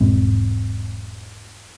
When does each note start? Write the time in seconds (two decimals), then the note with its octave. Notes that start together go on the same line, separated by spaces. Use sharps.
0.01 E1 G#2 C4